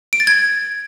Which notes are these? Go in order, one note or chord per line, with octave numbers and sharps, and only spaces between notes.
D7
A6
G#6